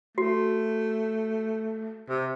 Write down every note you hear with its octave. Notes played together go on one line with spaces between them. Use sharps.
A3 F#4
C3